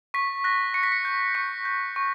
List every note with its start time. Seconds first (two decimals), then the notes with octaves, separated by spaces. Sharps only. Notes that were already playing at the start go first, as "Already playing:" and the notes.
0.14 C#6 B6
0.44 F#6 A#6
0.74 C#6 C#7
0.83 B6
0.92 C#7
1.05 G6
1.35 C#6 C#7
1.65 G6
1.96 C#6